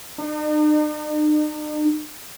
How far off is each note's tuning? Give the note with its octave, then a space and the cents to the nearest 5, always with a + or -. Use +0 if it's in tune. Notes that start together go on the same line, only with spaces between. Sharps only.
D#4 -45